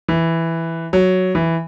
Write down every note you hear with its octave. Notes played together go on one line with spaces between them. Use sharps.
E3
F#3
E3